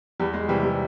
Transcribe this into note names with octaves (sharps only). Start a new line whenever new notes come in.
E2 G3
G#3
C3 E3 G3
G3